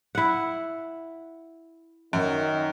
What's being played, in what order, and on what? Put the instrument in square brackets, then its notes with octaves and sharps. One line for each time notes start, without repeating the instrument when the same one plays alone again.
[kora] E4 F#5
[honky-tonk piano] F#2 [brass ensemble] D#3